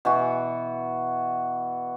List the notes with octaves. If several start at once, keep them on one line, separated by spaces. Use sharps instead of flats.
B2 E3 F#4